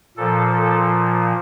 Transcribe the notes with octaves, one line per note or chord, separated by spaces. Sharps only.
A#2 F3 A4
A4